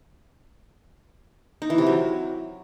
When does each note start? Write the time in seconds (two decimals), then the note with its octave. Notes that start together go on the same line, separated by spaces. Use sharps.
1.62 D#4
1.70 E3
1.78 C3
1.86 F#3